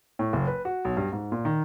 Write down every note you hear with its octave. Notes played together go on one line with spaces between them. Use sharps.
A2
F#1
B4
F#4
B1
G2
G#2
A#2
D#3